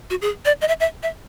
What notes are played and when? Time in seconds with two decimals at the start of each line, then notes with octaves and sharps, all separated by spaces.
0.10 F#4
0.22 G#4
0.45 D5
0.61 D#5
0.68 E5
0.80 E5
1.03 E5